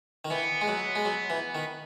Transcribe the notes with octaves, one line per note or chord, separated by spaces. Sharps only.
D#3
E3 B3
G#3
F#3
G#3
F#3
E3
D#3